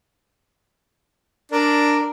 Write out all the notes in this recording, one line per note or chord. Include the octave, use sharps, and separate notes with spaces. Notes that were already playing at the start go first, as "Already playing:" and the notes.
D4 A#4 D5